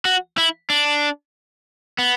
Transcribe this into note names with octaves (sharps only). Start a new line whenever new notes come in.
F#4
E4
D4
B3